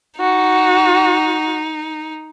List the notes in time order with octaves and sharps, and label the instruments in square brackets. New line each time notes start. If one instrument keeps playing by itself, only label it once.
[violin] D#4 [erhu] F#4